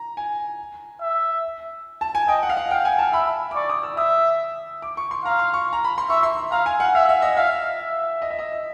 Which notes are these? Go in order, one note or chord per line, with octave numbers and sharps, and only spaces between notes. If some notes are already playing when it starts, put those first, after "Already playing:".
Already playing: A#5
G#5
E5
A5
G#5
D#5 G5
F#5
F5
F#5
F5 G5
G#5
A5
E5 B5
D6
D5 C#6
D#6
E6
E5 D#6
D6
C#6
C6
F5 A#5
C6
C#6
A#5
B5
C6
E5 C#6
C6
F5 A#5
G#5
F#5
E5 F5
E5
D#5
E5 F5
E5
D#5
E5
D#5